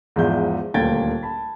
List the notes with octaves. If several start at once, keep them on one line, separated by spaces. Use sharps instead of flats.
E2 G#2 F3 D5 E5 G6
D#1 D2 A#3 G5 G#6 A6
A5 B5